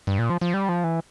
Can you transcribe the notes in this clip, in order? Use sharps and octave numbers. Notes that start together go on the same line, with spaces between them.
G2
A#2
F3
F3
G3
F3
E3